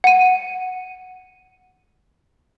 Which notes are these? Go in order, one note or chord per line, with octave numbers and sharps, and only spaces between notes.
F#5 D#7